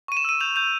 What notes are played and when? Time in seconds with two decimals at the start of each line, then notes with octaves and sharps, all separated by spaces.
0.08 C#6 D#7
0.17 E7
0.24 E6 D#7
0.41 G6 F7
0.56 G6 F7